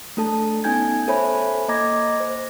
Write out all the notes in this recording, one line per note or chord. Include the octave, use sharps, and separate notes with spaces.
A3 D4 A4 A5
B3 C#4 D#4 G#5 G6 G#6
A4 C5 C#5 E5 G#5 B5
A#3 D#5 A#5 D6 G#6 A#6
C5